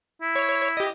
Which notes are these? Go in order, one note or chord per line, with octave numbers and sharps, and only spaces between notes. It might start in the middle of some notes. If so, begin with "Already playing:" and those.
E4
C#5
G4 D#5